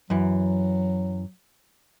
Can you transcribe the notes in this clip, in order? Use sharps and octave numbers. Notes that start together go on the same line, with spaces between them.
F#2 E3 F#3